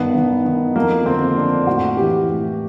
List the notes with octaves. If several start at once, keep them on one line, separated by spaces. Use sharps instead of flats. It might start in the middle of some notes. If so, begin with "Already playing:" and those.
Already playing: G2 D#3 B3
D#3
D#3
F2 A#3
D3 C4
F2 D4
A2 F#4
E3 G4
A2